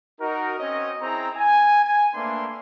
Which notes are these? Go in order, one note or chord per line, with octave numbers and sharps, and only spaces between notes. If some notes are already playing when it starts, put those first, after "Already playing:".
D#4 F#4 A#4
C4 C#4 F#4 C#5 D#5
C4 E4 G#4 G5 A#5
G#5
G#5
A3 A#3 C4 D4 B4 C6